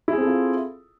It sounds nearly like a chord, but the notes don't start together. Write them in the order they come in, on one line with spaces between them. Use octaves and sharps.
E4 G#4 C4 A4 F4